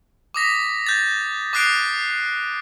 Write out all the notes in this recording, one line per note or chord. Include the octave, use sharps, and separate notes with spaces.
D6 D#6 A#6 B6
G6 A6
D6 D#6 F#6 C7 D7